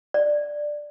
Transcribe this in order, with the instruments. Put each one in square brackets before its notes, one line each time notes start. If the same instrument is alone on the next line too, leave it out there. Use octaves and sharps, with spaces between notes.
[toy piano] D5